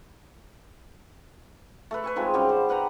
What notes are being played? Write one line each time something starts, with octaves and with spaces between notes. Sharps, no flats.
A3 A4 B4
B4 G#5 C#6
F3 G#3 C4 D#4
C#3 G3 F#4 G4
C5
G4 B4 F#5 A#5